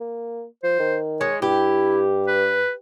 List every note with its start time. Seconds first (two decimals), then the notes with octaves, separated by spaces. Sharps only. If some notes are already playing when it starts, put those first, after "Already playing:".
0.01 A#3
0.63 F3 C5
0.80 D#3
1.21 G#3 C#5
1.42 G2 E4 G4
2.27 B4